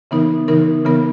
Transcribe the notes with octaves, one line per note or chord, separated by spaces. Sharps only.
C#3 E3 B3 D#4 A#4
C#3 E3 B3 D#4 A#4
C#3 E3 B3 D#4 A#4